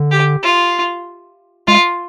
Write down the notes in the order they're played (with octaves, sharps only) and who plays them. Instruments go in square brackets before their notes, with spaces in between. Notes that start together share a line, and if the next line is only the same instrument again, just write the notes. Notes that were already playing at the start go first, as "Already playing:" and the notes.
Already playing: [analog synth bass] D3
[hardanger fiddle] G4
F4
[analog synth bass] G#3 [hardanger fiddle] F4